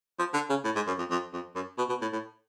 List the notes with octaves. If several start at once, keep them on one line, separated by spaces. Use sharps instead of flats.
F3
D3
C#3
A2
G#2
F#2
F2
F2
F2
F#2
B2
B2
A2
A2